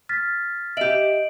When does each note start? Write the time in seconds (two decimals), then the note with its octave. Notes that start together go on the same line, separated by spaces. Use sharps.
0.09 F6 A6 B6
0.77 G4 D#5 E5 D7 F#7